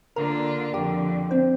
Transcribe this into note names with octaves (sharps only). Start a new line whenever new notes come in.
D3 A#3 D4 F4 A#4 A#5
F2 D3 F3 G4 G5
C4 C5